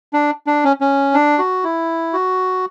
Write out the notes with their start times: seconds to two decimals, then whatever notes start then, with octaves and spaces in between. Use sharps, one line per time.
0.13 D4
0.47 D4
0.64 C#4
0.81 C#4
1.14 D4
1.38 F#4
1.64 E4
2.13 F#4